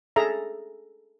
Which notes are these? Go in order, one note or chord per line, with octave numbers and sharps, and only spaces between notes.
G#4 A4 E5 A#5